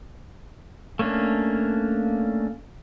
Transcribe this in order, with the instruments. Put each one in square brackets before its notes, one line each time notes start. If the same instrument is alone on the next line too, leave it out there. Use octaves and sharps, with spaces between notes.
[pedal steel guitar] A3 A#3 C#4 D4